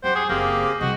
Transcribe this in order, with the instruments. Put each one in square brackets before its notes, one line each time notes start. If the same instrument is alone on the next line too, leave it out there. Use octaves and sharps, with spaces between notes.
[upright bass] F#2 [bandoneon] G4 F#5 G5 [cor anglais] C5
[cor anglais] G#4
[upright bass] F#1 [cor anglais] A#3 [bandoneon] C4 G4 G#4
[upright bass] C2 C3 [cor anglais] F#4 [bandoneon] D#5